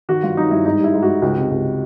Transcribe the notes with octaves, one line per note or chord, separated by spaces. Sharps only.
D#3 F#4
G2 F4
F#3 D#4
G2 E4
G#2 D#4
G3 E4
G#2
F#4
G3
C#2 F#4
C3
C#2